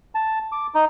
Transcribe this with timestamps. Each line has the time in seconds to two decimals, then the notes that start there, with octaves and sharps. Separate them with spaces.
0.15 A5
0.52 D6
0.74 D#4